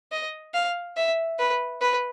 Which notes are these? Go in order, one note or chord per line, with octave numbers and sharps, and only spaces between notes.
D#5
F5
E5
B4
B4